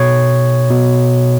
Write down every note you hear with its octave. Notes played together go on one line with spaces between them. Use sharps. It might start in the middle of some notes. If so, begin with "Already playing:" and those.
Already playing: B2 C#5
B2